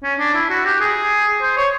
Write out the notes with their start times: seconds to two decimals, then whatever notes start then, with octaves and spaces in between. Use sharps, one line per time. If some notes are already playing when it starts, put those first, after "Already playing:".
0.03 C#4
0.19 D4
0.34 E4
0.50 F#4
0.65 G4
0.81 G#4
1.42 C5
1.57 C#5